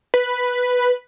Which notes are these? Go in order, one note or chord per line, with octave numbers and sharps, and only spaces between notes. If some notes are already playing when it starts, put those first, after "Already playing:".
B4